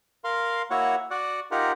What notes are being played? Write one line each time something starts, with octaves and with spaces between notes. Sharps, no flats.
A#4 F5 C6
A#3 E4 F#4 C#5 F#5
F#4 D5 F#5
D#4 F4 G4 A#4 F#5